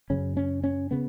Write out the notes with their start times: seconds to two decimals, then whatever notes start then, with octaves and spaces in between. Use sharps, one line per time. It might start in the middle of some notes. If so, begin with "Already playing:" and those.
0.10 F#2 C#3 C#4
0.37 C#4
0.64 C#4
0.91 C#3 B3